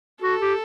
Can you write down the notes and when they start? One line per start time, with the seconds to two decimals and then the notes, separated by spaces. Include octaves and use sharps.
0.22 F#4 A4
0.41 G4